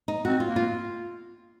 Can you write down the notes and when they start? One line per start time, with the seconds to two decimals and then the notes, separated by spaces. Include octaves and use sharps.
0.08 D#4
0.25 C4 F#4
0.40 F4
0.48 A#3
0.56 F4